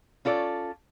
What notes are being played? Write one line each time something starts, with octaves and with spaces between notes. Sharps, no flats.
C#4 F4 A4 D5